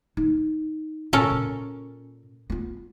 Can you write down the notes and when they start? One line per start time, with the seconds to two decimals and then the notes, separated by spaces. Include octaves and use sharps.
0.17 D#4
1.13 A#2 C#4 A4 A#4
1.30 A#2
2.50 B3 F4